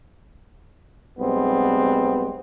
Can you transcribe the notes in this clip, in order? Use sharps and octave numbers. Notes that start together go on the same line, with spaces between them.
B1 G3 G#3 B3 C4